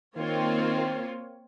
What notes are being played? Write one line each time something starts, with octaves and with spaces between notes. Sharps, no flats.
D#3 A#3 C4 F4 C#5